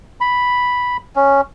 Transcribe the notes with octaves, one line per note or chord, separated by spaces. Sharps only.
B5
C#4